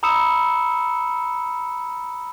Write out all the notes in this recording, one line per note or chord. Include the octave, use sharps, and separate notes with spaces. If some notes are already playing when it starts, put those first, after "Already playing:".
A#5 B5 D#6 E6 C#7 E7